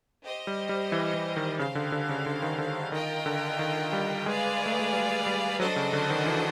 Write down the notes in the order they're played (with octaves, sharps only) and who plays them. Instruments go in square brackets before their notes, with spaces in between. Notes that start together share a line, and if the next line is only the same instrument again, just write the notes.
[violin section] G4 C5 D#5
[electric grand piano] G3
G3
E3
E3
D#3
[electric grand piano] C#3 [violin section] G4 C5 F5
[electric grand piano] D3
D3
C#3
D3
D#3
D3
[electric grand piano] D#3 [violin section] F4 A#4 D#5 G5
[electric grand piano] D3
D#3
G3
[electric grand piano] G#3 [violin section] G#4 B4 D5 F5
[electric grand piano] A3
G#3
G3
G3
[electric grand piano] F#3 [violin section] D4 F#4 A4 C5 D#5
[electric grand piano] C#3
D3
D#3
E3